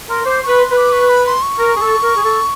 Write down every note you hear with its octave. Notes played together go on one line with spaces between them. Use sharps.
A#4 C6
C5 D6
B4 C#6
C6
B4
D6
C#6
B5
C6
C#6
A#4
G#4
A4
A#4
G#4
A4